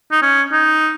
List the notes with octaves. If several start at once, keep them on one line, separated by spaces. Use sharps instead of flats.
D#4
C#4
D#4